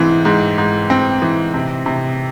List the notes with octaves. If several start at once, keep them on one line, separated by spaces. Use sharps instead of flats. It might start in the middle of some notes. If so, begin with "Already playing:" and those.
Already playing: G#2 E3 C4
G#2
G#2
C4
E3
C3
C3